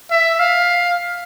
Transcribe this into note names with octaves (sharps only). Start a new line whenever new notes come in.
E5
F5